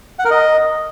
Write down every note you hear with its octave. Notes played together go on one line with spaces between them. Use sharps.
F#5
A#4
D#5